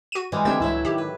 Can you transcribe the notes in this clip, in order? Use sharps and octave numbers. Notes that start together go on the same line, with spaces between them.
F#4 D#7
E3 G3 G#3
D3 A3 C4 D4 G4 E5 G#6
C#2 A2 F#3 E4 E5
D#3 G4
B4